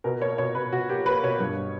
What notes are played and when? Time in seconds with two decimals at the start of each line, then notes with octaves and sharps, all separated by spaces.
0.04 B2 A#4
0.21 A#3 C#5
0.38 B2 C#5
0.55 B2 B4
0.72 B2 F#4
0.89 A#3 G4
1.06 A#3 B4
1.23 B2 C#5
1.39 G2